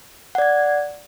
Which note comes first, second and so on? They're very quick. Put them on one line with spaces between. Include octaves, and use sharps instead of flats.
F#5 D5 G#6